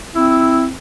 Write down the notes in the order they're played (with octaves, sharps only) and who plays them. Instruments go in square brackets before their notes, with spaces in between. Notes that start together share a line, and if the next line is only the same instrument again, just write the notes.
[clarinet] C4 [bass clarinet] E4